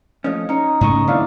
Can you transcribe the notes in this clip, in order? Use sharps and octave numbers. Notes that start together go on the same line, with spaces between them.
F3 A3 C#4 D#5
C#4 D#4 C#5
G#2 C#3 A3 D#5 C#6
D#2 F#3 B3 D4 E4 F5